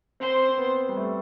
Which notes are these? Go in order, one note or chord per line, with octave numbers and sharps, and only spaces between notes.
C4 C5
C4
B3
G3
A3